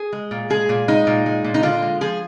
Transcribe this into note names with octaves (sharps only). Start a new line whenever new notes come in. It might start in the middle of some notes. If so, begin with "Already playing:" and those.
Already playing: G#4
G#3
A#2
G#3 G#4
A#2
G#3 D#4
A#2
G#3
A#2
D#4
D3 F4
G#3
F3 G#4